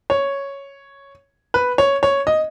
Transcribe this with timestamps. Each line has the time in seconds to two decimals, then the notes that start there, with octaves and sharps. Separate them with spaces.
0.10 C#5
1.54 B4
1.78 C#5
2.03 C#5
2.27 D#5